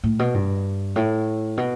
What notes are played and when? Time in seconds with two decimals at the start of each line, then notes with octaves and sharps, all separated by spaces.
0.04 A2
0.19 B2
0.34 G2
0.96 A2
1.57 B2